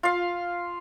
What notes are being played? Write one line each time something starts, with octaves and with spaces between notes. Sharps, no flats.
F4 F5